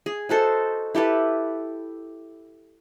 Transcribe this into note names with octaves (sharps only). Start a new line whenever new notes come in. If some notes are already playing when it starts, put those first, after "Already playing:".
G#4
D#4 F#4 A4 C5
E4 G4 A4 B4